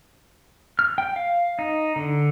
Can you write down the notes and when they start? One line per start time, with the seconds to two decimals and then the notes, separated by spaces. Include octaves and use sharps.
0.79 F6
0.98 G5
1.16 F5
1.59 D#4
1.96 D3